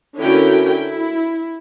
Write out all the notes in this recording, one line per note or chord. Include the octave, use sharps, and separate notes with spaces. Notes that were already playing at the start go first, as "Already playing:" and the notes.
D3 C#4 E4 F#4 A#4 G5
E4